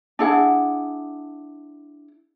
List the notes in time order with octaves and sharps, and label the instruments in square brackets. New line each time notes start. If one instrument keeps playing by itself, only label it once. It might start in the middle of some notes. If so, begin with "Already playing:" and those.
[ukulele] D4 E4 G#4 F#5